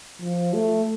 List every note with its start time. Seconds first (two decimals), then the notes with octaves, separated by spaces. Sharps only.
0.22 F3
0.54 A3